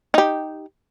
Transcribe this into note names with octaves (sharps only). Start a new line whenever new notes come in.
D#4 G4